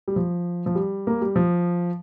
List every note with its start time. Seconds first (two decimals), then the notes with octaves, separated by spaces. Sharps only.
0.08 G3
0.16 F3
0.66 F3
0.75 G3
1.07 A#3
1.21 G3
1.36 F3